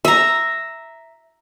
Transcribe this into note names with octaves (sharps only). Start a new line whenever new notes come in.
E5 A#5